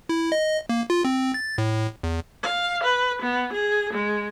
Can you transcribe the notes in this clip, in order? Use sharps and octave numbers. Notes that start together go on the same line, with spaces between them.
E4
D#5
A#3
F4
C4
A6
A2
E2
F5
B4
B3
G#4
G#3